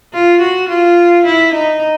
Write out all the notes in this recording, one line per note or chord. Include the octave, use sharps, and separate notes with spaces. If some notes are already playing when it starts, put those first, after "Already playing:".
F4
F#4
F4
E4
D#4